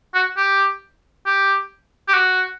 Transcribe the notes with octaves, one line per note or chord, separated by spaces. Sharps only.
F#4
G4
G4
G4
F#4